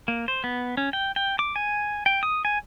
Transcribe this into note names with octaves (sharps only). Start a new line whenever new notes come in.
A#3
C5
B3
C#4
G5
G5
D6
G#5
G5
D#6
G#5